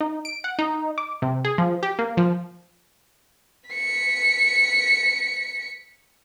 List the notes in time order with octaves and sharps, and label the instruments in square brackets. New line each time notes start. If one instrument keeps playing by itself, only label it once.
[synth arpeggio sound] D#4
D7
F#5
D#4
D6
C3
G#4
F3
G4
A#3
F3
[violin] B6 C#7